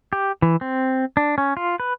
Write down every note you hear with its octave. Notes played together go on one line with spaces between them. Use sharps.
G4
E3
C4
D4
C#4
F4
B4